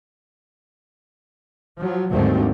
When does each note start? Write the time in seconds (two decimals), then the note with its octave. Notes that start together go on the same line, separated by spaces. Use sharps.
1.78 F3 F#3
2.12 D#2 G#2 D3 F#3 A3 C4